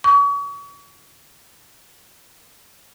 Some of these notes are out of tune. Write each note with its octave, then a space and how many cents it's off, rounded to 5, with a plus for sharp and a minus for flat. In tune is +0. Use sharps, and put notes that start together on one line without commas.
C#6 +40